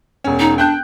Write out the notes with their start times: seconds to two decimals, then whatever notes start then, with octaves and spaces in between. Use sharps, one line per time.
0.24 E1 C#4
0.39 D#4
0.58 D4 G5 F#6 G6